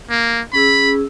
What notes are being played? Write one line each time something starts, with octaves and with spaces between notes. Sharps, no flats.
A#3
C#4 G#4 B5 E6